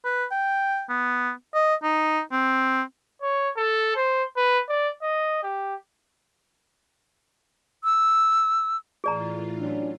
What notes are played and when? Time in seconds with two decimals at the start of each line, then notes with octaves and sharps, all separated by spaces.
0.05 B4
0.31 G5
0.89 B3
1.54 D#5
1.83 D#4
2.32 C4
3.22 C#5
3.57 A4
3.96 C5
4.37 B4
4.69 D5
5.02 D#5
5.43 G4
7.84 E6
9.04 A2 E3 F4 G#4 D5 A#5
9.59 F#3 C#4 D4